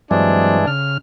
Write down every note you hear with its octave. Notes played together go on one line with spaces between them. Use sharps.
G2 E3 F#3 G#3 C4 D4
C#3 F6